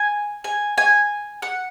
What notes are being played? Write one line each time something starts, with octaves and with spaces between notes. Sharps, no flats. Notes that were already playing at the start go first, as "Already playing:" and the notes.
Already playing: G#5
G#5
G#5
F#5